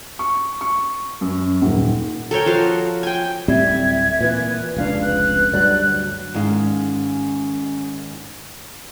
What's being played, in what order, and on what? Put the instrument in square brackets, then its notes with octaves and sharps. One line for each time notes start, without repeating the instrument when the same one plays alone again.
[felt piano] C#6
C#6
F#2
D#1
[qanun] A4 A#4 C#5 G5
F3 F#4 F5
G5 G#5
[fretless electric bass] D1 A2 G3 [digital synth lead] C4 [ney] E5 [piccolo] G#6
[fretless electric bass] A#2 E3 [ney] B4
[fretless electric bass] F1 C#2 D4 [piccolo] F5
[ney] B4 [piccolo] F#6
[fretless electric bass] D2 G2 F#3 [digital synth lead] D5
[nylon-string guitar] G#2 D#3 F5 [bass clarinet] C#4